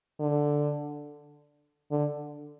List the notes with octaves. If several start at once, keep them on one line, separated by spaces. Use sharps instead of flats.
D3
D3